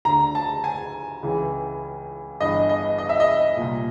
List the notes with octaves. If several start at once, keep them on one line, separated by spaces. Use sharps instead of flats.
D2 D3 A#5
A5
G#5
C#2 C#3 E3
G1 G2 E3 D#5
D#5
D#5
E5
D#5
C2 A#2